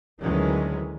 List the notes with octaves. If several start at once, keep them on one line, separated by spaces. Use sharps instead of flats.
D2 D#3 E3 F#3 G#3 C#4